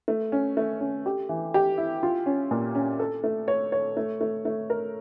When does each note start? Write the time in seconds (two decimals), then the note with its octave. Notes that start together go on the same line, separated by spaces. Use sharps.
0.08 A3
0.32 C#4
0.57 A3
0.80 C#4
1.06 G4
1.29 E3
1.54 G4
1.78 E4
2.03 F4
2.26 C#4
2.51 A#2
2.75 C#4
3.00 A4
3.24 A3
3.48 C#5
3.72 C#5
3.97 A3
4.21 A3
4.45 A3
4.70 A#4